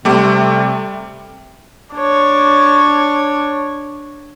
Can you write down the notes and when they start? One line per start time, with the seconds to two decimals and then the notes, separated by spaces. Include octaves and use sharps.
0.05 C3 G3 A3 D6
1.94 D4 C#5